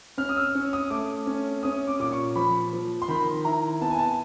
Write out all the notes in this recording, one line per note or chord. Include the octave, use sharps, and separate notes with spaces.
C#4 F6
D#6
E6
C#4
D#6
A3 D6
C#4
C#4 D#6
D6
A#2 D6
C#6
F3 B5
F3
C6
D#3 B5
E4 A#5
B3 A5
G#5
A5